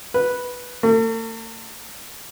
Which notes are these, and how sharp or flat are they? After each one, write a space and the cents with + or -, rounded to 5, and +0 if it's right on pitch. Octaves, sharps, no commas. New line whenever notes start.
B4 -5
A3 +45